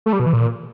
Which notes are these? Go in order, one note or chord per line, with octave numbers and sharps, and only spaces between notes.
A3
G3
B2
E3
A#2